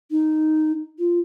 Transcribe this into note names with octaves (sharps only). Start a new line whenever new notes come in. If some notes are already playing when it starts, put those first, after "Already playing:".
D#4
F4